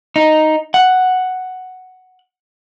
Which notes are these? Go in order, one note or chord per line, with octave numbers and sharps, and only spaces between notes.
D#4
F#5